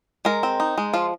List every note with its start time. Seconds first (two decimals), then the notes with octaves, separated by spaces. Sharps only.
0.25 G#3 A#4
0.43 C4
0.60 D#4
0.78 G#3
0.94 F3 F4